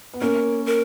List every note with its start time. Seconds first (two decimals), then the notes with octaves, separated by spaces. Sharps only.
0.14 B3
0.21 A#3 C#4 A#4
0.66 A#4